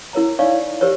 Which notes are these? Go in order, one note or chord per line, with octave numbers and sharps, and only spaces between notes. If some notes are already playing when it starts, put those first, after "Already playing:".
E4 A#4 C#5 A#5
D#4 C#5 D5 F5 C#6
G4 A#4 C5 C#5